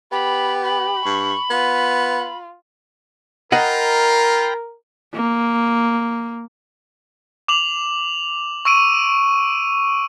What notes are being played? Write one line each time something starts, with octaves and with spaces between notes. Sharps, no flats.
B3 G4 B5
B5
G2 C#6
B3 F4
F4 A#4 D#5 F#5 G5 A#5 B5
A#3
D6 F7 F#7
C#6 E6 D7 D#7